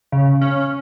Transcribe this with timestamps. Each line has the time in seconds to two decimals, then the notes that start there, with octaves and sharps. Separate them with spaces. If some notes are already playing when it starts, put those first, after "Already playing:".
0.12 C#3
0.41 C#4